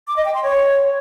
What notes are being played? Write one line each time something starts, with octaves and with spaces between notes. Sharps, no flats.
D6
D#5
G5
C6
C#5